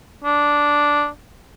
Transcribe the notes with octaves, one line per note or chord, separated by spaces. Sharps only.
D4